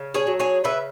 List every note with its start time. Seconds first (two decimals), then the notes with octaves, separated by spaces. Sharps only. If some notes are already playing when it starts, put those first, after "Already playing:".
Already playing: C#3
0.14 G#4 C#5
0.27 F#3
0.39 G#4 C#5
0.64 C#3 B4 E5